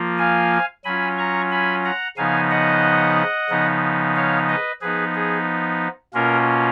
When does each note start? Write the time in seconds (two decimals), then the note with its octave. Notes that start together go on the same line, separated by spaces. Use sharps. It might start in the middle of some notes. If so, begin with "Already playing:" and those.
Already playing: F3 A#3 F4
0.18 F5 G#5
0.84 F#3 C#4 F4 G#5 B5
1.18 A#5 C#6
1.51 G#5 B5
1.84 F#5 A#5
2.17 C#3 F3 B3 D#4 F5 G#5
2.50 D#5 F#5
3.49 C#3 F3 B3 D#4
4.16 C#5 F5
4.49 B4 D#5
4.81 F3 B3 D#4 G#4 B4
5.15 G#4
6.14 B2 A#3 C#4 F4 A#4